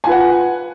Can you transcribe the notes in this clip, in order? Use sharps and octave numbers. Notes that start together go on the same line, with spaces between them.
F4 B4 F#5 G#5